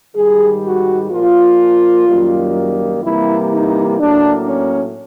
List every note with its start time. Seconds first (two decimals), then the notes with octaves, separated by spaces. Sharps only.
0.16 G#2 D#3 G3 G#4
0.64 F#4
1.11 A#2 F3 A#3 F4
2.08 F#2 D#3 G3 A#3
3.03 C3 E3 G3 A#3 E4
3.52 D#4
4.00 A2 F#3 A#3 D4
4.47 C#4